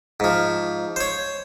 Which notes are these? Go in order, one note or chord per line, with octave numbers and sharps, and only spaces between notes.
G#2 F3
C5 C#5